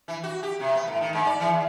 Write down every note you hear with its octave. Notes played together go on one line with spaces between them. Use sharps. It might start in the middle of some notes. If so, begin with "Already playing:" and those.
E3
F#4
G4
C3
B3
A2
D#3
G#2
D5
E3
E2